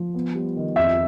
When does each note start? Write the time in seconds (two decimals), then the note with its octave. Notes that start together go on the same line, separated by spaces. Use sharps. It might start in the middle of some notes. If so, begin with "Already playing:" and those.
Already playing: F3
0.14 B3
0.35 G3
0.56 D#3
0.76 F2 E5